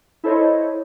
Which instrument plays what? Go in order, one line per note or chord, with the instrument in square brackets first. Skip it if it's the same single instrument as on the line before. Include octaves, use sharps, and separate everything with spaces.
[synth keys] E4 A4 C5 C#5 D#5